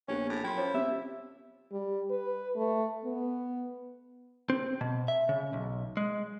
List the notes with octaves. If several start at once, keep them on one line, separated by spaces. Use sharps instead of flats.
A#1 B3 C#4 G4 C#5
A2
F#2 E4 G5 C6
F3 C#5
C3 B3 C#4 E5
G3
B4
A3
B3
C4
B2
E5
C#3
B1
G#3